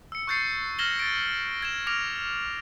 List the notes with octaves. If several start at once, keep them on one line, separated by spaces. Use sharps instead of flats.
E6 C#7
C#6 F#6 G6 A6 C7 C#7
F6 G#6 A#6 E7 F#7 G7
A6 D7
G#6 A#6 E7
D6 F6 G#6 A#6 D7 F7